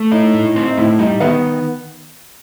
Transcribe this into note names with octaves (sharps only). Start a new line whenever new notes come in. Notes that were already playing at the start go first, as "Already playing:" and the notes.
Already playing: A3
D#4 E4
A2
C4
D#4
A2 E4
G3 D#4
D#3 B3